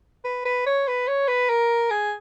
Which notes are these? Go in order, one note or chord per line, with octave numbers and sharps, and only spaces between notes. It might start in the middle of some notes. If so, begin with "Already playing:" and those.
B4
B4
C#5
B4
C#5
B4
A#4
G#4